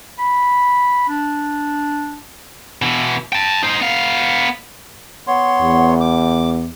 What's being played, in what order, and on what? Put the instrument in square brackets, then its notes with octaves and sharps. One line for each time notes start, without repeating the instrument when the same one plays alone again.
[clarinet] B5
D4
[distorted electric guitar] B2 E3
G5 A5
D#4 C5
B3 F5
[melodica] B3 C#5 C6
[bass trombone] E2
[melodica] D6